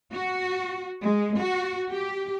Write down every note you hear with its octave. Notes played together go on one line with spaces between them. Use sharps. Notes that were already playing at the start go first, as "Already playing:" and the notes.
F#4
G#3
F#4
G4